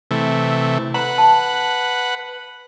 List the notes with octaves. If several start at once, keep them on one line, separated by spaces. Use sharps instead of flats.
C3 E3 A3
B4 F#5 A#5
A5